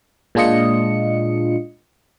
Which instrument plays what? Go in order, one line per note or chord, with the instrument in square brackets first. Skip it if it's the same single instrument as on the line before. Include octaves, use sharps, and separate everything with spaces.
[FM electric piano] A#2 G#3 D4 F4 D#5 C#7